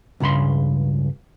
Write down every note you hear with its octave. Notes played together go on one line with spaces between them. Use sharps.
C#2 G2 C#3 B5 C6